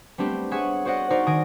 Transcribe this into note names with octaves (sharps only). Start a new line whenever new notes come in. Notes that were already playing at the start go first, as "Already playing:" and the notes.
G3 A3 B3 C4 D4 G4
G#4 C#5 E5 F#5 G#5
F#4 C5 D5 D#5 F#5
D#4 F#4 A#4 C5 D5
D#3 G#5 D#6 A#6 D7